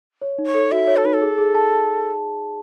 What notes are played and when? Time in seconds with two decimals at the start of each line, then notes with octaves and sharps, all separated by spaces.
0.22 C#5
0.38 D#4
0.46 C#5
0.54 A4
0.72 F#4 E5
0.87 C#5
0.97 A4
1.05 D#4 B4
1.13 A4
1.22 G#4
1.38 G#4
1.55 A5